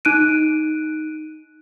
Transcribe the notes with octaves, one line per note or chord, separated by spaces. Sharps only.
D#4 F#6 D7 D#7